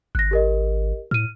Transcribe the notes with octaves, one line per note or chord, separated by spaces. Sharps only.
G#1 F#6 A#6
G4 A#4 D#5
A2 F6 D#7